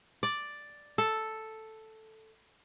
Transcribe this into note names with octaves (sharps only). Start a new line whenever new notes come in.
D5
A4